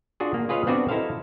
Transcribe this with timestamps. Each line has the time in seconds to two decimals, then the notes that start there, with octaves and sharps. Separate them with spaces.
0.20 D4 F4 F#4 G#4
0.34 A#3
0.49 F4 G#4 B4 C#5 D#5 F5
0.67 B3 C4 D4 F#4 B4 D5
0.89 D#4 E4 A4 C5 F5